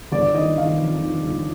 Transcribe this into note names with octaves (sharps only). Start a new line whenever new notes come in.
G1 D5
D#3 D#5
D#3 F5
F2
D#3
G1